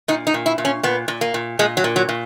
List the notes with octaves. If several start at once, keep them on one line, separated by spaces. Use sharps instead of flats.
A#2 D#4
D#4
A#2
E4
A#2
C#4
A#2 B3
A#2
A#3
A#2
A#2 G#3
F#3
A#2
F#3
A#2